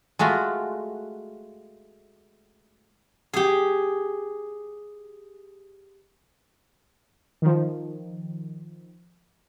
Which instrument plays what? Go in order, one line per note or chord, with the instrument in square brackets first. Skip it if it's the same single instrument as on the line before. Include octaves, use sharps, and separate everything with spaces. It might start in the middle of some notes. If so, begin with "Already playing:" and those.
[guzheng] G#3 A3 F4 F#4
G4 G#4
[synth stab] D#3 F3